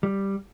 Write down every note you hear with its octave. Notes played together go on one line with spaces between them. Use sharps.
G3